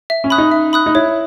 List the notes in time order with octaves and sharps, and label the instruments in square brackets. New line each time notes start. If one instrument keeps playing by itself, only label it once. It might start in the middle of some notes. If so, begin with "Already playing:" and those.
[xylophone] E5
[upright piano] C#4
[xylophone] B5 D#6 F#6
[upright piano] D#4
[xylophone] E5
B5 D#6 F#6
[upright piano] D#4
[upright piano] E4 [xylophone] C#5